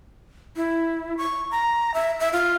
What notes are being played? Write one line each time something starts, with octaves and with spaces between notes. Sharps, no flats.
E4
C#6
A#5
E5
E5
F4